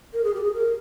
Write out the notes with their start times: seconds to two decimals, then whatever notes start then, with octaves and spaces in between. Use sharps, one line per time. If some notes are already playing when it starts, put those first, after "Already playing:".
0.14 A#4
0.24 G#4
0.34 G4
0.43 G#4
0.54 A#4